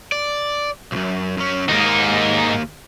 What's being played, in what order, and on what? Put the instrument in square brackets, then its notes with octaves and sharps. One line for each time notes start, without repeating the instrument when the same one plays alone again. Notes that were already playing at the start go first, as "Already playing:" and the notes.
[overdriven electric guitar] D5
B1 F#2
F#2 C#4
[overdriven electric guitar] D#2 A#3 [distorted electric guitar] G#2 D#4